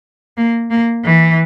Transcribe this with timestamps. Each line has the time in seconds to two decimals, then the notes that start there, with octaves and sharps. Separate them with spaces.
0.37 A#3
0.71 A#3
1.04 E3